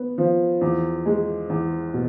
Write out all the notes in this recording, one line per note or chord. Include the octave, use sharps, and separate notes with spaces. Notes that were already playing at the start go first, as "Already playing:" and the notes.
Already playing: B3
F3
E2
G#3
E2
B2